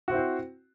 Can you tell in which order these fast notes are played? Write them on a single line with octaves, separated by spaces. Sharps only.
F#4 C4 E4 C5